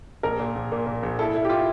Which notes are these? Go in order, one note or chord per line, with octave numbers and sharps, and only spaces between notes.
A#1 A#4
A#2
A#1
A#2
A#2
A#1
E4 A4
E4
G4
E4 F4